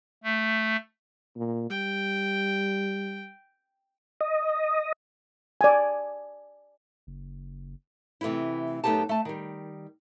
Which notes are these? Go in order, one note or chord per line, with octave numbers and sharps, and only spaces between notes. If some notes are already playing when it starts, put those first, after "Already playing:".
A3
A#2
G3 G5
D#5
D5 G#5
F#1
C3 E3 A3 B3 E4
F#2 A3 B3 D#4 G4 A5
A3 A5
D#3 G3